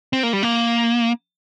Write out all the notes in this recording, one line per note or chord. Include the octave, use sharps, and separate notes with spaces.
C4
A#3
G3
A#3